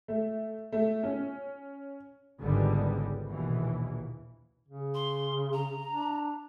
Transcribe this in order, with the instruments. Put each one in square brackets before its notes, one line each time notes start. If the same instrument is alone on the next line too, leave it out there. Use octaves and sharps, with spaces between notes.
[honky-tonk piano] A3
A3
C#4
[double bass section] G#1 C#2 D3 G3 G#3 B3
A#1 D#2 B2 E3
[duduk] C#3
[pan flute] C6
A#5
[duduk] D4